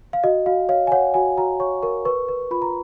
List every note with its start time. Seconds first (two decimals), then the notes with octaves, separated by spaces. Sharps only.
0.13 F5
0.24 F#4 D#5
0.46 F#4 F5
0.69 C#5 F5
0.87 G#5
0.92 C#5 F#5
1.14 F#4 G#5
1.37 F#4 A#5
1.60 C#5 C#6
1.82 A#4 C#6
2.05 B4 C#6
2.28 B4
2.51 F4 B5
2.62 A#5